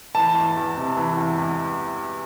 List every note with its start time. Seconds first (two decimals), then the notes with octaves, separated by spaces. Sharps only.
0.15 E3 A5
0.35 E2
0.56 E2
0.77 C3
0.97 E3
1.17 E2
1.38 E2